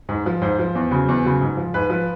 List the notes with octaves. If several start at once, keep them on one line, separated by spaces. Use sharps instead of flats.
G#2
F3
G#2 C5
F3
E2
C#3 F#3
E2
C#3 F#3
G#2
F3
G#2 B4
F3